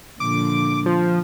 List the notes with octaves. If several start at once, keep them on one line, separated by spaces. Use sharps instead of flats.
A#2 D3 F3 D6
F3